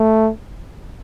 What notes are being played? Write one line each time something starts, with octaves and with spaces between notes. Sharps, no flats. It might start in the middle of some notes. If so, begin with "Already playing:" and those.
Already playing: A3